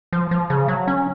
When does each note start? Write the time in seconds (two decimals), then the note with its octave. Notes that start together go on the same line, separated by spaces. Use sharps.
0.13 F3
0.31 F3
0.50 C#3
0.68 F#3
0.88 C#4